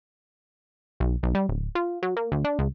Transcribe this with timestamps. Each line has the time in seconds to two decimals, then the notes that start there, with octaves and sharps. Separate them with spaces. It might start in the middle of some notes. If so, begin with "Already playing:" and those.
1.00 B1
1.23 B1
1.35 G3
1.49 D1
1.75 F4
2.03 F#3
2.17 A#3
2.32 D2
2.45 D4
2.59 C#2